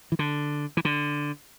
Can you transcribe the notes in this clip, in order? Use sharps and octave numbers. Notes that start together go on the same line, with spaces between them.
E3
D3
E3
D3